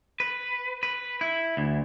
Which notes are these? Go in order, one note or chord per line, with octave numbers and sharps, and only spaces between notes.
B4
B4
E4
D2